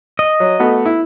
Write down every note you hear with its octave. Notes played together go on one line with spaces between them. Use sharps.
D#5
F#3
A3 B3 F#4
E4